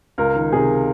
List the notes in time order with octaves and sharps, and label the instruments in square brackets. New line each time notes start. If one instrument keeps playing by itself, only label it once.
[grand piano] C#2 A#4
D#3
C3 G#4